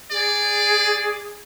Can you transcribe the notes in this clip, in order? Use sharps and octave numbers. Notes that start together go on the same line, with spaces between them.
G#4 D5